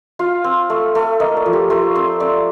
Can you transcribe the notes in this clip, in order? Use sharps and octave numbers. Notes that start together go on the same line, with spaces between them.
F4 F5
C4
A3
A3
A#3 D#5
D5
F3
G4
A3 C5
C4
C4 D5